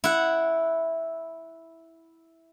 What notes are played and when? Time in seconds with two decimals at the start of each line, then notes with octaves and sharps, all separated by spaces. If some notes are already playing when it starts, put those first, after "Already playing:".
0.04 E4 F#5